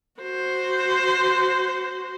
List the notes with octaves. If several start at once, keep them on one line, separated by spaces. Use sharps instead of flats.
F#4 C5